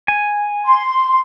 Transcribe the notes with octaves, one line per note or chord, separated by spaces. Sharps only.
G#5
C6